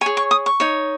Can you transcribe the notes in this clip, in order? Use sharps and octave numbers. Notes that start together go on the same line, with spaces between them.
G#4 C#5 G#5
C#6
D#6
C#6
D#4 C#5